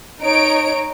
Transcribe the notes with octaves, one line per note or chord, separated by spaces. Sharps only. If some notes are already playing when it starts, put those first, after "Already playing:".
D#4 C#5 D7